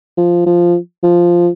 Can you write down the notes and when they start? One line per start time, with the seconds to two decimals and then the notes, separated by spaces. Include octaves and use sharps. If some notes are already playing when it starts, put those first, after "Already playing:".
0.17 F3
0.46 F3
1.03 F3